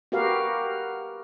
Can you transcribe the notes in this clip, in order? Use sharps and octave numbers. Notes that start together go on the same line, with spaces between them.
F#4 G4 A#4 B4 F5